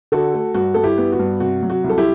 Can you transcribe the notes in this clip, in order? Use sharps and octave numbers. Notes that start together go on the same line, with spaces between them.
D3 F#4 A4
A3
G2 F#4
G2 A4
E4 G4
B3
F#4
G2
C3 F#4
F#3
F#4
C2
A4
E4 G4